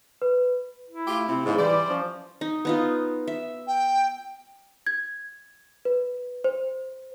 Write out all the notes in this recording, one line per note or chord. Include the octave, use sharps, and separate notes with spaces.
B4
E4
A3 F4 G4
C3 C4 E4
E2 G#2 C#3
E3 G3 E4 C5 D5
F3 C#4
D#4
B3 D#4 F4
E5
G5
G#6
B4
C5